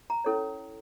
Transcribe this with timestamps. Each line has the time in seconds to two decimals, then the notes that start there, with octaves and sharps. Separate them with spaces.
0.10 A#5
0.24 C#4 E4 A4 C#5